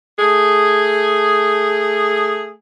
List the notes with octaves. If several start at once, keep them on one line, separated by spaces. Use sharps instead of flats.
A3 G#4